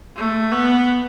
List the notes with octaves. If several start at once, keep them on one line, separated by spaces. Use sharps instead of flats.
A3
B3